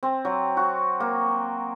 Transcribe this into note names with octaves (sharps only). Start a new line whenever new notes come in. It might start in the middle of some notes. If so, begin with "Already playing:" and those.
C4
F#3
F#4
A#3